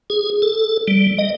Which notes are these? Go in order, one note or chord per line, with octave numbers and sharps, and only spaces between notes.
G#4
A4
G3
D#5